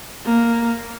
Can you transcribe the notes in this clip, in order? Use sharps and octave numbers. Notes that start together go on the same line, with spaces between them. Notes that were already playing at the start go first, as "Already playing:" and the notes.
A#3